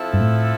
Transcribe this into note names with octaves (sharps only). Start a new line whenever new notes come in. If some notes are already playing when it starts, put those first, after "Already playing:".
Already playing: F3 C4 E4 A4
G2
A2